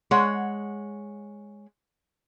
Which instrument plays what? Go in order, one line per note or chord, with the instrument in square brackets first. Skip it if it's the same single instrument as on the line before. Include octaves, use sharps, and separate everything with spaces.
[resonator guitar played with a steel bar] G#3 C#5 F#5